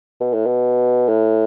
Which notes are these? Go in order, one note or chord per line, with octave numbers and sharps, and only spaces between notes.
B2
A2
B2
A2